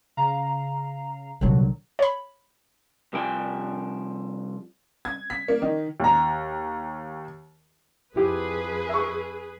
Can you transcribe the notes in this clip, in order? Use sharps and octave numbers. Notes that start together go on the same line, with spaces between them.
C#3 F5 A#5
C2 A#2 D3 D#3 F#3
C#5 B5
C2 F3 G5 G#5
G#6
B6
A#3
D#3
D#2 A#5
F2 E4 G4 G#4 B4
E5 C#6